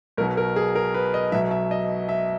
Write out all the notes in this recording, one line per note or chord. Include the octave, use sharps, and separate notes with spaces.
B1 B2 F#3 A#4
A#4
G#4
A#4
B4
D#5
B1 B2 F#3 E5
E5
D#5
E5